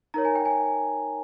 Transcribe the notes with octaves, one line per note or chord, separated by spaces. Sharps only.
D#4 A#4 C#5 A#5
G#5
G5
G#5